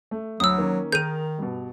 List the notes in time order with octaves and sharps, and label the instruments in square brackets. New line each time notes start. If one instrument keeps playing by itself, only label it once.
[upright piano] A3
[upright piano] D2 [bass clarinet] F#3 [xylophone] D#6 E6
[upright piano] D#3 A#3 C#4
[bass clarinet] D#3 [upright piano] G#4 A#4 F7 [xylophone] G6 D#7
[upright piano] G2 B2